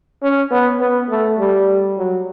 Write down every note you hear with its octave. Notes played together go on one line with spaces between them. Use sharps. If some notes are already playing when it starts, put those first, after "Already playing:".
C#4
B3
B3
A3
G3
F#3